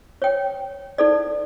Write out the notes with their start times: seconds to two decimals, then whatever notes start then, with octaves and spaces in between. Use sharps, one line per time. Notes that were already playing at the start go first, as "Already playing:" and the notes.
0.22 C#5 G5
0.98 D#4 A4 D5